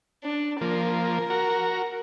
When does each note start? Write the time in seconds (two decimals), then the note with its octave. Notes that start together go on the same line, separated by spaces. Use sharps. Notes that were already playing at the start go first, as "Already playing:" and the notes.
0.24 D4
0.61 F3 A#3 A#4
1.30 F#4 A#5